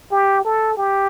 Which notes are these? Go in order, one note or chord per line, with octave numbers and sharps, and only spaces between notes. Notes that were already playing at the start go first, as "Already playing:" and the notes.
G4
A4
G4